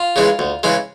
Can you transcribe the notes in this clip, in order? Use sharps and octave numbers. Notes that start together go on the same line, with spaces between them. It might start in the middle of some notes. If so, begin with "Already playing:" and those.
Already playing: F4
C#3 E3 G#3
D2
C#3 E3 G#3